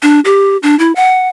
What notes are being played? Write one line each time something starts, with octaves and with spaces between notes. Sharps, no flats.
D4
G4
D4
E4
F#5